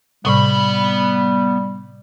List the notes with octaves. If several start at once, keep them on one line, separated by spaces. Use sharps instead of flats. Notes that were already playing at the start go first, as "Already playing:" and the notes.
A2 C3 G3 B3 B5